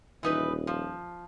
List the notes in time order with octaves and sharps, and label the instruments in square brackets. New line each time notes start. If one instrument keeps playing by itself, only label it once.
[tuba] D#1 [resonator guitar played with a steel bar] E3 D#4 B4
[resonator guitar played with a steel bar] F3